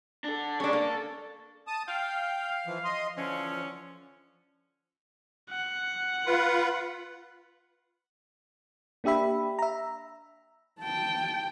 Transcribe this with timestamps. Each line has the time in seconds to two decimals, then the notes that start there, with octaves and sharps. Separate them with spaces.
0.24 D4 A4
0.60 G3 G#3 C#4 D4
0.73 A#3 A4
1.67 A5 D#6
1.87 F5 G5
2.66 E3 F3
2.84 D#5 C6
3.15 D3 E3 F3 C#4
5.50 F#5
6.26 F4 B4
9.04 A#3 D4 G4 E5 B5
9.59 E5 A#5
10.80 G5 A5